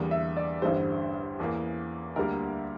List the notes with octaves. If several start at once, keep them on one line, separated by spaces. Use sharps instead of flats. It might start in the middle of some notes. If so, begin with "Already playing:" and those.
Already playing: E2 D3 G3 A#3
E5
D5
A1 G2 D3 G3 C5
E2 E3 A#3
D2 D3 G3 A#3 A#4